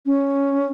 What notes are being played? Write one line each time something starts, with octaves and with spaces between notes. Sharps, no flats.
C#4